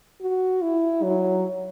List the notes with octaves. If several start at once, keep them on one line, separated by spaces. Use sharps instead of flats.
F#4
E4
F#3